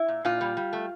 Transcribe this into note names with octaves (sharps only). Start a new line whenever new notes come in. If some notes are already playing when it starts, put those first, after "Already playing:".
Already playing: E4
A#2
A#2 F4
G3
G3
A3